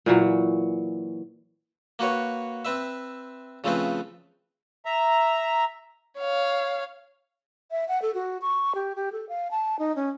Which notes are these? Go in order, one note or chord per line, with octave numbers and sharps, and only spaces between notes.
A#2 E3 F#3
A#3 F#4 B4 C#5
C4 B4 E5
C#3 F3 A3 C4 G#4 B4
E5 A#5
C#5 F5
E5
F#5
A4
F#4
C#6
G4
G4
A4
F5
A5
D#4
C#4